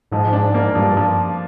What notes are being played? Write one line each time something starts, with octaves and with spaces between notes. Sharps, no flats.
G#2 F3
D4
A#3
G2 F3
F3